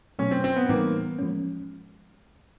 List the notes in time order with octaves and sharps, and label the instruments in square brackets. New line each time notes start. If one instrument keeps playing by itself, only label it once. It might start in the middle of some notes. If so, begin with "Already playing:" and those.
[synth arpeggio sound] B2 F#3 A3 [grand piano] C#4
[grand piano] C4
C4
B3
[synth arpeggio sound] A2 E3 G3 B3 D#4 [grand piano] A#3
[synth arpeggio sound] F3 G#3 C#4